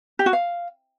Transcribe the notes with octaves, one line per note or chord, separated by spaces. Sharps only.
G4
F#4
F5